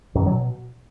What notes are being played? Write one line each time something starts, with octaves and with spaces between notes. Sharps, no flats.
F#2
D#3
F#3
B2